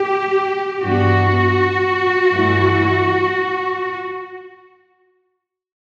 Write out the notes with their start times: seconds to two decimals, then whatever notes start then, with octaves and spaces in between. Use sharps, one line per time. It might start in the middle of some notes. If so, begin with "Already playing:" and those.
Already playing: G4
0.83 G2 E3 B3 D4 F#4
2.32 G2 E3 A3 E4